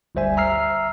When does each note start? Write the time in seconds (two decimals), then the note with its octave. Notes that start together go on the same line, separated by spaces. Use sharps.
0.15 G1 D2 G3 C5 E5 G#5
0.37 E5 A#5 E6 F6 C7